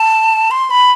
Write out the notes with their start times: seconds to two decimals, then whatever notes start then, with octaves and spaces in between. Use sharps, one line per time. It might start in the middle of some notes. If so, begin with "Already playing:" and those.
Already playing: A5
0.51 C6
0.70 B5